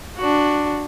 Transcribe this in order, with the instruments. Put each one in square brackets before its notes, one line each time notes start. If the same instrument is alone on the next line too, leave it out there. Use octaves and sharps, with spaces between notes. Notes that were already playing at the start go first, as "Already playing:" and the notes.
[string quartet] D4 F#4